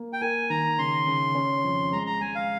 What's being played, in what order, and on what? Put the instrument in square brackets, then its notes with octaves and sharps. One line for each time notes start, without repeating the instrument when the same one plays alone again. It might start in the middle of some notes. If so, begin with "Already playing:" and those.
Already playing: [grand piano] A#3
[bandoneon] G5
[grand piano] A#4 [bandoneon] G#5
[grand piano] D#3 [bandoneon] A#5
[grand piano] C#3 [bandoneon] C6
[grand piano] C#3
C#4
F2
[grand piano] G#3 [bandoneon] A#5
[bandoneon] A#5
[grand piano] G#3 [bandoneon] G#5
[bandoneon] F5